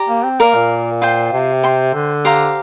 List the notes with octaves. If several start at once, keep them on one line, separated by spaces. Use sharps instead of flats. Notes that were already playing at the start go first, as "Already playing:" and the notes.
Already playing: G4 D5 A#5
A#3
C4
A#3 A#4 D5 F5
A#2
F4 C5 G5
C3
C5 G5 C6
D3
G4 C5 F5 A#5